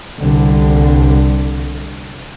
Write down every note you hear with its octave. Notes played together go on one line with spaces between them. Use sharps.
C2 D3